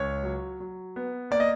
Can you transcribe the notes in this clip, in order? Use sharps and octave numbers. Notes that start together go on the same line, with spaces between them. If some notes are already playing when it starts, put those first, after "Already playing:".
Already playing: C#2 C#5
F#3
F#3
B3
A#3 D5
D#5